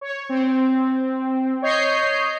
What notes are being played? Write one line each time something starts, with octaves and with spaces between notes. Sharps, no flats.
C#5
C4
C#5 D#5 G6 C7